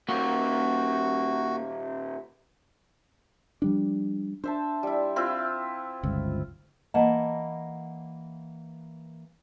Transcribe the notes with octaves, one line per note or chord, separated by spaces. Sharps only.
A#2 D#3 A#3 F#4
F3 G3 D4
D4 C5 E5 A5
G3 E4
C4 E4 F4
G1 C#2
E3 A#3 D#5 F#5 A5